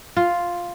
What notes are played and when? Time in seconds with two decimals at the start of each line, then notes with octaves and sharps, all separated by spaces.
0.17 F4